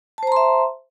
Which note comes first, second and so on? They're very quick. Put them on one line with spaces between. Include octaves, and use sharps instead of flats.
A5 C5 A#5 C6 E5